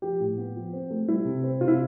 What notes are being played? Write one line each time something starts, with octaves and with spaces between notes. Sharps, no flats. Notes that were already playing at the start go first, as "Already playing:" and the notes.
F3 G4
A2
B3
F3
C4
A3
G3 E4
C3
C4
C3 F4
E4